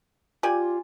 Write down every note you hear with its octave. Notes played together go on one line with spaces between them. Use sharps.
F4 G4 D5 G#5